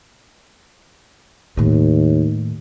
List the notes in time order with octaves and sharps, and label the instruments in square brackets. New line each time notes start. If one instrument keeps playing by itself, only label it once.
[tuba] D#2 [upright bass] A2 D#3